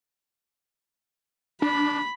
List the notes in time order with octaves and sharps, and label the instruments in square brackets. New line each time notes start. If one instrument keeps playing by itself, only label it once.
[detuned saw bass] D4 [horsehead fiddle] B5